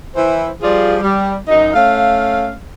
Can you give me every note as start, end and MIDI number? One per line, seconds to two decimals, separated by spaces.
0.16 0.49 52
0.16 0.49 64
0.16 0.49 72
0.62 0.96 53
0.62 0.96 55
0.62 0.96 65
0.62 0.96 68
0.62 0.96 74
1.01 1.35 55
1.48 1.73 42
1.48 1.73 63
1.74 2.53 57
1.74 2.53 61
1.74 2.53 77